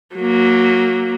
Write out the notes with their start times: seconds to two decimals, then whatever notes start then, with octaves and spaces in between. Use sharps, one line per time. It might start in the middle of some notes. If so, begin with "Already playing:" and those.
0.17 F#3 A#3